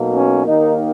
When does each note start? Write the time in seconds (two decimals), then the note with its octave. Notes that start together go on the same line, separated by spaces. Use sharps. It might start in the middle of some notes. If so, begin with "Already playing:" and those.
Already playing: B1 B2 A#3
0.15 C#4
0.46 D#2 D#3 A#3 D#4